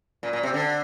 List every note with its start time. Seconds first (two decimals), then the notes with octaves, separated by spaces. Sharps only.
0.23 A#2
0.33 A#2
0.43 C3
0.54 D3